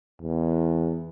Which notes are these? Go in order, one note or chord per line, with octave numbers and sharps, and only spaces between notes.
E2